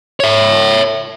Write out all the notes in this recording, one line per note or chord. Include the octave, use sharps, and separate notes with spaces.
C#5 E5